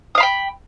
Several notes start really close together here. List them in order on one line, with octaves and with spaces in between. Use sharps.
D#6 F5 B5 G5